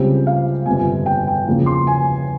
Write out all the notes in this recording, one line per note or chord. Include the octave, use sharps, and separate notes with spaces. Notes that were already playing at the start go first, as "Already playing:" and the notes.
Already playing: C#2 C#3 G3 C4 G4
F5
G1 F2 C3 G#5
G5
G5
E2 C#3 F3 A#3
C6
G#5